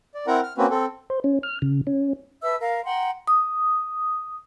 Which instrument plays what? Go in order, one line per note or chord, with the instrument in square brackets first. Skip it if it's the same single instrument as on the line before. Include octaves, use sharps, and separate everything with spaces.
[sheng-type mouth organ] D5
C4 E4 A#4 F#5 A#5
F6
A#3 C4 C#4 F#4 B4
C4 A4
[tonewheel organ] C5
C#4
F6
C#3
C#4
[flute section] B4 E5 A5 E6
A#4 F5
F#5 G5 A#5 C6
[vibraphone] D#6